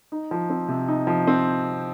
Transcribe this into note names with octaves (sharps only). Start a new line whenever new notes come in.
D#4
F3
C4
C3
D#4
F3
C4